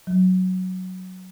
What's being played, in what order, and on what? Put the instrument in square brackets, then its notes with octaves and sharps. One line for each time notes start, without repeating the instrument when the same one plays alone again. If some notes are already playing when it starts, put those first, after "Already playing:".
[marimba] F#3